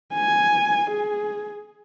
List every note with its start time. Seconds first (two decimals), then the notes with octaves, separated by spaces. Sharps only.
0.13 G#5
0.90 G#4